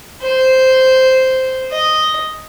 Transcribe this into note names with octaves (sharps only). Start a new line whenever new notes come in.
C5
D#5